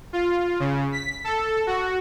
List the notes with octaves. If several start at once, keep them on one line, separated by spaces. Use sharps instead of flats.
F4
C#3
B6
A4
F#4